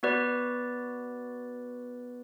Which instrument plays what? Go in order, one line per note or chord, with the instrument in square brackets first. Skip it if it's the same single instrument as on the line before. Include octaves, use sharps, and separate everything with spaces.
[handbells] B3 F#4 B4 D5